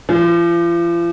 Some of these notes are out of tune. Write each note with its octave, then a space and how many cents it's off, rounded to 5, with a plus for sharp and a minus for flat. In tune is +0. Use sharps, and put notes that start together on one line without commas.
F3 -40